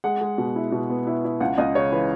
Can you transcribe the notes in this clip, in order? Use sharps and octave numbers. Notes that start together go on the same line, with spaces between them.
G#3 F#5
G#3
B2
E4
B2
B3
E4
E4
C#2 F#5
C#2 D#5
C#3 C#5
E3 B4